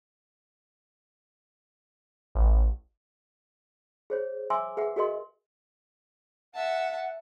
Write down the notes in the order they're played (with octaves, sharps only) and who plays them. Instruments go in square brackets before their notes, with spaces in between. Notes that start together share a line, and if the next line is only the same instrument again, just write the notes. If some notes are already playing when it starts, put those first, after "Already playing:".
[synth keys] A1
[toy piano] G#4 C5 C#5
E5 G#5 C6 D6 E6
G#4 B4 E5 F#5
F#4 G#4 A#4 D#5 C6
[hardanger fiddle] E5 A5 [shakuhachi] F#5